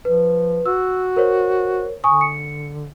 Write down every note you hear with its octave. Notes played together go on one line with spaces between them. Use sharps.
F3 B4
F#4 E6
A#4 C5 C#5
D3 G#5 C#6 D#6
C#7